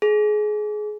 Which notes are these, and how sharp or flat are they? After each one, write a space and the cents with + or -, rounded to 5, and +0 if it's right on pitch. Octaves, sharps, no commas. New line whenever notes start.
G#4 +25